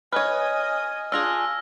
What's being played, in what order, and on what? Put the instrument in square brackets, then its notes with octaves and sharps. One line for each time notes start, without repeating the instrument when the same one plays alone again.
[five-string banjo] B4 C#5 [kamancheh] D#5 G#5 [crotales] F6 G#6
[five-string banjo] D4 F4 G#4 [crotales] E6 F6 A#6